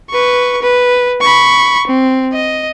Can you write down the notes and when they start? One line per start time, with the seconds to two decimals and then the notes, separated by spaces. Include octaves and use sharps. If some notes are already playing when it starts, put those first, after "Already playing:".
0.10 B4 C#6
0.62 B4
1.21 B5 C#6
1.87 C4
2.33 D#5